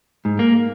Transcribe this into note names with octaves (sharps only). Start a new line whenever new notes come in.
G#2
A#3